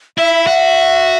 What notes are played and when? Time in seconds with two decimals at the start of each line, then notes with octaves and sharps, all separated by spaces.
0.18 E4 E5
0.47 F#4